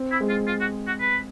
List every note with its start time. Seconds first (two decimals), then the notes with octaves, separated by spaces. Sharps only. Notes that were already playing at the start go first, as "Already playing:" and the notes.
Already playing: C4
0.11 E4
0.20 G#3
0.29 F4
0.47 F4
0.60 F#4
0.87 F#4
1.00 B4